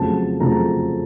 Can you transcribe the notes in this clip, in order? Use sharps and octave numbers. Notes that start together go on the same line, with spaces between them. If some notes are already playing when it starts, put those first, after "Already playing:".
Already playing: F2 C#3 F#3 A3 C4 A5
F2 C#3 F#3 A3 C4 A#5